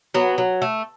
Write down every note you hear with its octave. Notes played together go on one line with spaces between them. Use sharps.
F#3 B3
F#3
A3